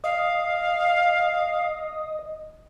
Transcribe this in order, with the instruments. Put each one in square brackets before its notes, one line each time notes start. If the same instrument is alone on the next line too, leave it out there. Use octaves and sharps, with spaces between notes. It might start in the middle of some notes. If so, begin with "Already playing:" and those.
[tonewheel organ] D#5 [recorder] F5